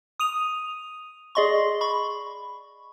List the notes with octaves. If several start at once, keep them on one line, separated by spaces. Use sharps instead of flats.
D#6 D#7 F7
G#4 D5 D#5 C6 C#6
B5 C#6